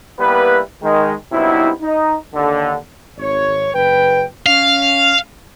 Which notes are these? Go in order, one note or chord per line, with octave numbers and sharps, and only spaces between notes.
G3 A#3 B3 E4 G4 B4
D#3 G#3
G2 C3 F#3 B3 D#4 E4
D#4
D#2 D3
G#1 C#5
F#1 B4 G5
C#4 F5